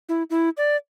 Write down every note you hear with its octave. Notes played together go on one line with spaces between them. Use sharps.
E4
E4
D5